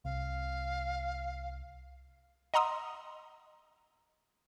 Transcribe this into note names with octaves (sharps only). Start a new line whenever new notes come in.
C2 F5
D#5 F#5 A#5 C6 D#6 E6